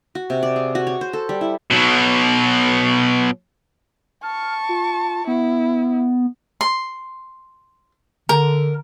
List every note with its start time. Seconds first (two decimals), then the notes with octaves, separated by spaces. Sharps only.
0.15 F#4
0.30 C3
0.43 D5
0.56 G#4
0.75 F#4
0.87 C#5
1.01 C5
1.13 A4
1.29 G3
1.41 E4
1.71 B2 F#3
4.23 A5 C#6 F6
4.69 F4
5.27 B3 E4
6.61 C6
8.29 D3 A#4